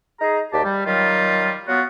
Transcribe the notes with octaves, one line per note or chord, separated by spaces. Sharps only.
D#4 G#4 A#5
D#2 G4 D5 A5
G3
D#3 F#3 G3 F4
F#3 B3 F4 F#4